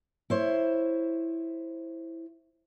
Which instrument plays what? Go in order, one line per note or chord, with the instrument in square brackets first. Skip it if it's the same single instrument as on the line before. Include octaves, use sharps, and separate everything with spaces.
[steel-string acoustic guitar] E4 C5 C#5